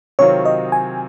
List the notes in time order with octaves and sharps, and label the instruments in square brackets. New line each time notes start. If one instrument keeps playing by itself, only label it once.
[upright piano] C3 D#3 F#3 C4 F4 [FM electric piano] C#5
[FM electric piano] D#5
G#5